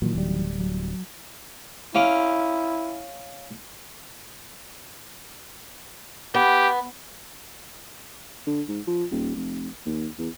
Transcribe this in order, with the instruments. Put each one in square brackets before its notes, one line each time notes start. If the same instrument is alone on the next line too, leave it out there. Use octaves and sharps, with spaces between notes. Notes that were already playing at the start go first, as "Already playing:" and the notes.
[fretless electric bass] A#2 [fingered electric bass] D#3 E3 F#3
[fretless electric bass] D1 G3
[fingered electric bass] F#3
[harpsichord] C#4 F5 D6 [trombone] E4
[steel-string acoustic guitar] B3 [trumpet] G4
[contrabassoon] D3
G#2
F3
D#1
F1
D#2
E2